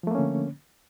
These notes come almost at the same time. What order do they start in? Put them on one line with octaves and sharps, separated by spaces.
F3 A3 A#3 C#4 D3